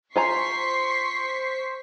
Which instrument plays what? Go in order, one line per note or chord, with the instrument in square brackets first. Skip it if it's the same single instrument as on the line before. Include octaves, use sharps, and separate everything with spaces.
[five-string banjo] F4 G#5 A#5 [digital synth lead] C5 [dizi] C6 [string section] C#6 B6 C7